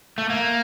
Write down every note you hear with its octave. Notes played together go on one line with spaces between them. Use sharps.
A3
A#3